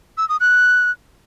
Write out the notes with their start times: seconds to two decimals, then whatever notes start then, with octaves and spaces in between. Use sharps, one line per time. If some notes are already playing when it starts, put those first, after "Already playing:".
0.18 E6
0.29 D#6
0.40 F#6